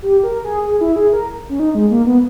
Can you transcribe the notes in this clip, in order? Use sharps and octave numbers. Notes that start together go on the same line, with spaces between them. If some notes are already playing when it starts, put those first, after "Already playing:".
G4
A#4
G#4
G#4
E4
G#4
A#4
C#4
D#4
G#3
A#3
B3